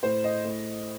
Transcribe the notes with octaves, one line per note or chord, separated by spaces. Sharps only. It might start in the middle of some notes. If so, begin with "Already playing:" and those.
A2 C5
D#5
A2